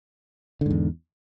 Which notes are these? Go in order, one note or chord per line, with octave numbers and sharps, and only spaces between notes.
E2 G#2 D3